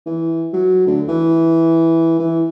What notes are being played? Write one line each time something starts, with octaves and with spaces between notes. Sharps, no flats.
E3
F#3
D2
E3
E3